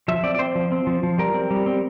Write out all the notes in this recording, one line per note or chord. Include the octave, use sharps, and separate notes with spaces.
F3 E5
C4 D5
D5
C4 C5
F3
C4
F3
F3
G3 A#4
C4
G3
C4